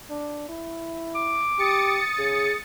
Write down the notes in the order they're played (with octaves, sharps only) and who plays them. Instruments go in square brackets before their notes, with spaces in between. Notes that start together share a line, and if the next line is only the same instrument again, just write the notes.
[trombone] D4
E4
[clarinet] D6
[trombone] G4 [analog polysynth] D#6 A6 C#7
[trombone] C#3 [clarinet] G#4